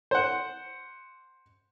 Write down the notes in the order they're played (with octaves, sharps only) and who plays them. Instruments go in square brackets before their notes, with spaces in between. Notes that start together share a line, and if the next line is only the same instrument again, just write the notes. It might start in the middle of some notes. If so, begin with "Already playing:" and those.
[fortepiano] C5 F#5